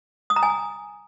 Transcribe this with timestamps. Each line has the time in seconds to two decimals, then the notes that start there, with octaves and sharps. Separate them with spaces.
0.30 D#6
0.36 A#5
0.43 G#5